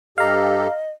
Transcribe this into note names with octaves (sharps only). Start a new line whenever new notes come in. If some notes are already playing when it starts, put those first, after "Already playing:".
G2 G4 A4 D#5 F5 A#5